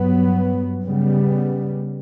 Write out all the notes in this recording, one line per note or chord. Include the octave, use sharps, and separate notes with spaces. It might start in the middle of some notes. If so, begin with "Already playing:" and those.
Already playing: G2 F#3 B3
C#3 G3 B3